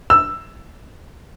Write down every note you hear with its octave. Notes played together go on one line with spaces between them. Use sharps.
E6